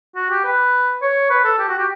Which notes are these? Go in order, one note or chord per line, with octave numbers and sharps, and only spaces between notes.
F#4
G4
B4
C#5
B4
A4
G4
F#4
G4